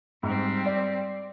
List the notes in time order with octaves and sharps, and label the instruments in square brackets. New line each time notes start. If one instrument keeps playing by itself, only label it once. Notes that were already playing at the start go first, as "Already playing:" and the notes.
[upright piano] G#2 [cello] G3 C4
[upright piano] D5